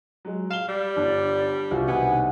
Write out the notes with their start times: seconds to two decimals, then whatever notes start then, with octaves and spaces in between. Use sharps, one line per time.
0.25 F#3 G#3
0.51 F5 E7 G7
0.68 G3 D5
0.96 G1 D4
1.71 C2 F4 F#4
1.88 B2 D#3 B3 F#5 G#5